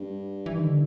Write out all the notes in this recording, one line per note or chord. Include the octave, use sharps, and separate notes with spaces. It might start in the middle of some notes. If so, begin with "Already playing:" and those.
Already playing: G2
E3
D#3
D3